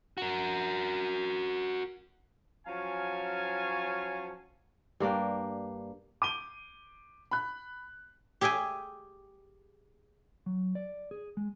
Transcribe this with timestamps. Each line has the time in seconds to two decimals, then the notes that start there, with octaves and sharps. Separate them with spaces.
0.18 F#4 A#4
2.67 F3 F#3 C#4 F5 G#5 A5
5.00 G2 A#3 D4 G5
6.22 D6 D#7 G7
7.31 B5 F#6
8.41 G4 G#4 E5 G5 G#5
10.46 F#3
10.75 D5
11.11 G#4
11.37 G#3